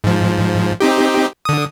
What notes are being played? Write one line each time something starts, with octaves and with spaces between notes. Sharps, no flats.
G#2 F3
C4 D#4 G4
D3 D#6